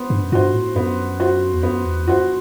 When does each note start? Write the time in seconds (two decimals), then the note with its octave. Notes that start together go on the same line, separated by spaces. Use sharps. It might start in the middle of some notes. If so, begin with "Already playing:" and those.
Already playing: B3 C5
0.10 G2
0.23 F#2
0.32 G2 F#4 C5
0.53 A2
0.75 F#2 B3
1.20 F#4 C5
1.54 E2
1.63 F#2 B3
1.85 E2
2.07 F#2 F#4 C5